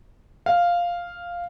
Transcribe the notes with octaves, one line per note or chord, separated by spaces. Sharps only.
F5